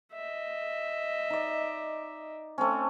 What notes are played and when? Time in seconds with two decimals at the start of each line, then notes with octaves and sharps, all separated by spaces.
0.13 D#5 E5
1.30 D#4 D5
2.58 A3 C4 C#4